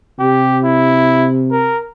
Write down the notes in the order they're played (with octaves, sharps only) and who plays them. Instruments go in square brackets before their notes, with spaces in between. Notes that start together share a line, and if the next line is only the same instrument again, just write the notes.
[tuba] C3 [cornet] G4
[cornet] E4
A#4